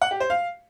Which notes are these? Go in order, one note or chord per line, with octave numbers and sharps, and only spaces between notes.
F#5
G4
C5
F5